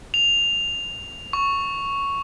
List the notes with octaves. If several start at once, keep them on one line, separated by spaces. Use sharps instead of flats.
F7
C#6